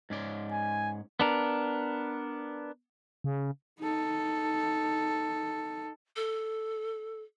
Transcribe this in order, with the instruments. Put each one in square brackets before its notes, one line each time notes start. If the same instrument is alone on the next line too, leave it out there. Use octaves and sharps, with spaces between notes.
[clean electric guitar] G#2 C#4 D5
[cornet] G#5
[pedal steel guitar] B3 D4 A#4
[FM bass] C#3
[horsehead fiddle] D#4 A4
[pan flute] A4